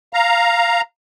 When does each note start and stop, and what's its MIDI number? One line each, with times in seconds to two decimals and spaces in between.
0.13 0.81 77
0.13 0.81 82